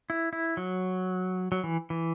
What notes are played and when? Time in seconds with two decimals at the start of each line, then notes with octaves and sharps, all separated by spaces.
0.10 E4
0.33 E4
0.57 F#3
1.52 F#3
1.64 E3
1.90 E3